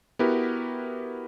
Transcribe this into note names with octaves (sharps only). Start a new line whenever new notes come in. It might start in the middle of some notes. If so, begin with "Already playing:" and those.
B3 E4 F#4 G4 A#4 B4